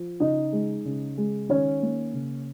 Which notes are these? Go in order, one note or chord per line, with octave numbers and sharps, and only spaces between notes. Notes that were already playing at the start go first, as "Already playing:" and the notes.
Already playing: F3
C#3 D#4 D#5
G#3
C#3
G#3
D#3 C#4 C#5
A#3
C#3